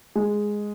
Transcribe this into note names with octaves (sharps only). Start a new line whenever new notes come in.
G#3